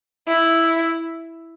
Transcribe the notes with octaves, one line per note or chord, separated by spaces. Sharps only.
E4